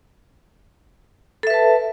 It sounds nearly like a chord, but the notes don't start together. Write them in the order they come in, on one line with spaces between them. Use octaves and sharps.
A4 E5 B4 A5